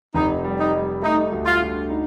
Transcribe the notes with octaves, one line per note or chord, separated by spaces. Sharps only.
F1 D#4
G3
D#4
G3
A3 D#4
D2
F4
D3
D#4